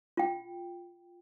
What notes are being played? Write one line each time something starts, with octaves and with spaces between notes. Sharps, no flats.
F4 G5